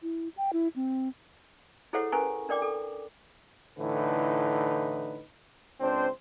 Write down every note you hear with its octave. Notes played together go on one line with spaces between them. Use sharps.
E4
G5
E4
C4
E4 G#4 A4 C5 C#5 F#5
C#4 A#4 B4 G#5 A#5 C#6
D4 A#4 D5 G5 D6
A4
A2 D3 E3 D#4 B4
C#2 C4 D4 C5